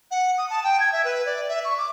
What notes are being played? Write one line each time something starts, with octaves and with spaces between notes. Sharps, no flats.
F#5
D#6
A5
G5
G#6
E5
B4
D5
E5
C#6
D6